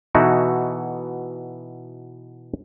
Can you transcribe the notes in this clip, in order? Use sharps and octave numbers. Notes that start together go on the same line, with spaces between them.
B2 E3 D#4 E4 F#4 A4